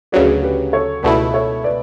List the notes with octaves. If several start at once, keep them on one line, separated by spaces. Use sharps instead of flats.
D2 C#3 F#3 B4 D5
G4 B4
A4 C#5
C#2 B2 A3 E4 B4 D5
A4 C#5
B4 D5